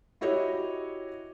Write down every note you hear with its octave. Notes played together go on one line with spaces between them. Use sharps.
E4 F#4 G4 C#5 D#5